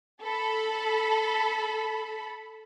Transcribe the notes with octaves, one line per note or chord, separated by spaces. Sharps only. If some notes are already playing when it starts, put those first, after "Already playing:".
A4 B5